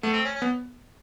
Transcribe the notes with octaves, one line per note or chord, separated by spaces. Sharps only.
A3 B3
C4
C#4
C#4
B3